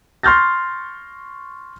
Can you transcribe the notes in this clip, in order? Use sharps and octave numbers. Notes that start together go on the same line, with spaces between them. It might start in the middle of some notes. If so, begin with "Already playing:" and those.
C6 C#6 F6 G6 A6 A#6